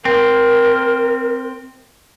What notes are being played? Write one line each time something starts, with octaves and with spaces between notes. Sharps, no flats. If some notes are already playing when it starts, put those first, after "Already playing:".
C4 A#4